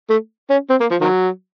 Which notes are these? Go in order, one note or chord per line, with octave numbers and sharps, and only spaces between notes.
A3
C#4
C4
A#3
F3
D#3 F#3